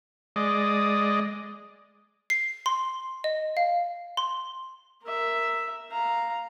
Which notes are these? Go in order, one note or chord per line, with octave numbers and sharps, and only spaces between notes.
G#3 D5 D#5
C7
C6
D#5
F5
C6
A#4 E5
F5 A#5